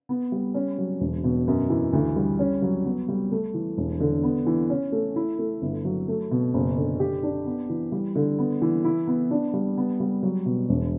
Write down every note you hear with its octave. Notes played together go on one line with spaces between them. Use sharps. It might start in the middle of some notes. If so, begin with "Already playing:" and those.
B3
G3
C#4
F#3
E1
B2
F#2
E3
D2
G3
C#4
F#3
B3
G3
A3
E3
E1
D3
B3
E3
C#4
A3
E4
A3
G1
F#3
A3
B2
F#1
D3
G4
D4
B3
E3
G3
D3
B3
E3
E4
B3
D4
G3
B3
G3
F#3
B2
E1